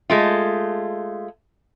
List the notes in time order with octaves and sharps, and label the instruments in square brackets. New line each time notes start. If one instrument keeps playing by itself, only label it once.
[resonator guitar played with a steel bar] G#3 A3 F4